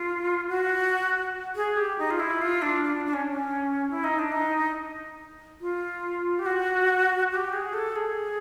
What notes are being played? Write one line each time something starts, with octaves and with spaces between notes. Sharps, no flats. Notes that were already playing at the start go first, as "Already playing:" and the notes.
Already playing: F4
F#4
G#4
G4
D#4
F4
E4
F4
D4
D4
D4
C#4
C#4
E4
D#4
D4
D#4
F4
G4
F#4
G4
G#4
A4
G#4